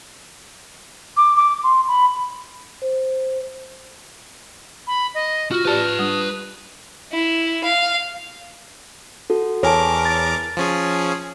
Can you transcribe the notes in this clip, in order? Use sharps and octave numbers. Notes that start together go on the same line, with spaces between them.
D6
D6
C6
B5
C5
B5
D#5
F4 F#4 F6
G4 B4 D5 A5
G3 D4 D#6
E4
F5
F#4 A4
E2 A#4 C#5 G#5 A5 D6
A6
F3 C#4 G#4